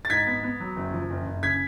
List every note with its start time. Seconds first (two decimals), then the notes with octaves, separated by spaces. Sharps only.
0.05 A6
0.10 G#2 G#6 B6
0.27 B3
0.43 B3
0.60 F#3
0.76 F#1
0.93 F3
1.10 F#1
1.26 F#1
1.43 C#3 G#6 B6